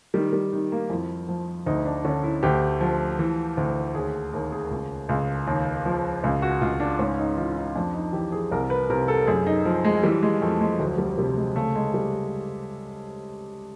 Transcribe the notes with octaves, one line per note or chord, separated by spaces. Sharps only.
D#3 G3
G3
D#3
A#3
F2 E4
F3
D2 D#4
D4
D3 C#4
E4
D2 G4
F3
E3
D2
D#2 G#4
D#2 A#4
G#4
C#2
C#2
D#2
F3
C#2
F#4
C#2 F4
D4
G#2 C#4
D#4
E3 F4
D#4
F2 D4
D#4
E3 G4
G#4
C2 A#4
B4
C3 A#4
A4
F#2 G#4
D#4
F3
G#3
E3 G3
G#3
F2 A3
G#3
D2 F#3
G3
C3 G3
G#3
C#3 A3
G#3
G3